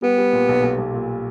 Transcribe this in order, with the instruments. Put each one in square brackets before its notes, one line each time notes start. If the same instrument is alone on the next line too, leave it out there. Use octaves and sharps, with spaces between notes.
[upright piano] G3 [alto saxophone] B3
[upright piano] G3
A#2
B1
B1
B1
A#2